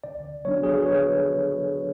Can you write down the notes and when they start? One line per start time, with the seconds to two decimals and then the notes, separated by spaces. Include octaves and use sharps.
0.04 D3 D5
0.45 F#3 B3 D4 C#5
0.56 F#4
0.63 G#4
0.72 A4
0.78 B4
0.86 D3 C#5